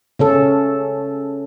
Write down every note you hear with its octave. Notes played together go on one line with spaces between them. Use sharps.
C#3 C#4 A4